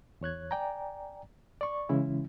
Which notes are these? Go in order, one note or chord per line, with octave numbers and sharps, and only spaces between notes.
E2 C#5 F#6 G#6
D5 G5 G#5 A#5
D5 C#6
C#3 E3 G#3 C#4 E4